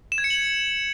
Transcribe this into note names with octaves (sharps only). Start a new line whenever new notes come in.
E7
G#6
C#7
F#7